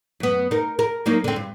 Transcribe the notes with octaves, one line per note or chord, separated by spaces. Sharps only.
F#2 B3
D#4 A#4
A#4
F#3 A#3 D#4
D3 C4
G2